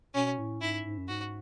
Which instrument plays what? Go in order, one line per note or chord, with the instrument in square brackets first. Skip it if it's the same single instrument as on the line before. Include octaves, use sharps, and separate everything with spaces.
[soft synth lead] B2 [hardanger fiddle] C#4
[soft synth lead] A2
[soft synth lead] G#2 [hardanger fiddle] E4
[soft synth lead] G#2
F#2
[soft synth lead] G#2 [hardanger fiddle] F#4